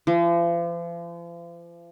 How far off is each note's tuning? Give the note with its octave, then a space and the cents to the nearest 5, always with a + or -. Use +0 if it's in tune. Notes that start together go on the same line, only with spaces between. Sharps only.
F3 -40